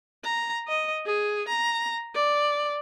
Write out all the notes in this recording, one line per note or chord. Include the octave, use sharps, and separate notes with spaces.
A#5
D#5
G#4
A#5
D5